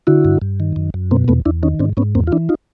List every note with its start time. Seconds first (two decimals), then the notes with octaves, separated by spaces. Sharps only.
0.07 D3 E4 F#4
0.25 G2
0.42 G2
0.60 D#3
0.76 F#2
0.94 F#2
1.11 B2 A#3 C4
1.28 E2 A3 B3
1.46 E2 D4 E4
1.63 D#3 C#4 D#4
1.80 G#2 C4 D4
1.97 G#2 B3 C#4
2.15 E2 A#3 C4
2.27 F4
2.32 E3 D4 E4
2.49 D#4 F4